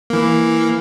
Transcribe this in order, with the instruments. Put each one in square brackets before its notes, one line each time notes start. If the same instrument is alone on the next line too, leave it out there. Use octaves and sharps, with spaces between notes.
[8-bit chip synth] E3 A#3